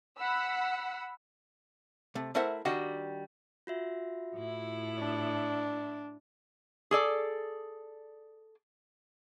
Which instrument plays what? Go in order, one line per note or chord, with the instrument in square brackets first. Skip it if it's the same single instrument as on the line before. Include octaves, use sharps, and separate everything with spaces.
[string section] F#5 B5 E6
[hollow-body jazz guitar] C3 A3
A3 E4 A#4 C5 E5 F#5
D#3 G3 D4 F#4 D#5 F#5
[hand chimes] F4 F#4 E5
[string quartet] A2 E4
[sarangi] D4
[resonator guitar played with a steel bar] G#4 A4 D5